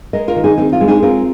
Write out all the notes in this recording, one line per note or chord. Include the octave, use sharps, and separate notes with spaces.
G#3 A#4 D#5
F4 A#4
D#3
D#4 G#4
C4 D#4
F4
G#3
D#4 G#4
C4 F4 A#4